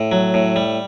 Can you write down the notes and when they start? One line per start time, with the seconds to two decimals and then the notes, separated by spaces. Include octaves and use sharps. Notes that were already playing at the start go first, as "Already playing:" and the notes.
Already playing: A2
0.12 F#3
0.34 A2
0.56 G3